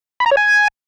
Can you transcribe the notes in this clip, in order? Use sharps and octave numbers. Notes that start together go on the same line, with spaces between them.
B5
A#5
C#5
G#5